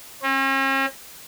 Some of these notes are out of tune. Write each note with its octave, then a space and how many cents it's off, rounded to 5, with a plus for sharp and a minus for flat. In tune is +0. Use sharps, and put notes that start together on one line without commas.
C#4 -45